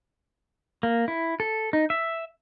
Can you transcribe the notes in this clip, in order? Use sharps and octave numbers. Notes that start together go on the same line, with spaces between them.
A#3
E4
A4
D#4
E5